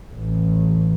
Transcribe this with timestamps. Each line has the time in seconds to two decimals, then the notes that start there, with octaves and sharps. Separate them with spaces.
0.14 A1